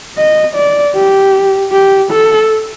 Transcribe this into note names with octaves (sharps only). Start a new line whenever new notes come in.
D#5
D5
G4
G4
A4